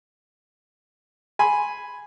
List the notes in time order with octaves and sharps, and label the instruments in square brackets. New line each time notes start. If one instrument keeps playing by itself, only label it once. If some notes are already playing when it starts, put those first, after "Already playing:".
[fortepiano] G#5 B5 C6